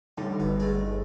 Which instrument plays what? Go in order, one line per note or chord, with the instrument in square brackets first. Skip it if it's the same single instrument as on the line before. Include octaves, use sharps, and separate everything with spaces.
[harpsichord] A2 [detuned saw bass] D3 [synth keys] G3 D#4
[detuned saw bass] G1 [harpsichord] B2
[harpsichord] G#3 A3